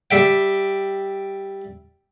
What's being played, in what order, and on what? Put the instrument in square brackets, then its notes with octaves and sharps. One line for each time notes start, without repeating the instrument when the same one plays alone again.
[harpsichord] G3 E5 G5